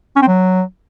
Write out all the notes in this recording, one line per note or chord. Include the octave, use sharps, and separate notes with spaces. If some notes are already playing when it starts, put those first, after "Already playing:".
C#4
C4
F#3